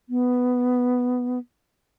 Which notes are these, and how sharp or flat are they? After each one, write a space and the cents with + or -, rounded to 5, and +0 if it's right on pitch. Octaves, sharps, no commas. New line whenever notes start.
B3 +5